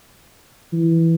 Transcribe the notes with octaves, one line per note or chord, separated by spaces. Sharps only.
E3